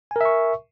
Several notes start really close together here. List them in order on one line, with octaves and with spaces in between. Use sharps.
G#5 A#4 E5 C#6